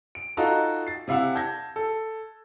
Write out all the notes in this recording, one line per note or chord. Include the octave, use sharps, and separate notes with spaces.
D7
D#4 F4 F#4 A4 D#5 A#5
A6 C7
C3 E4 F5 F#5 E6
A5 G6 G#6 A#6
A4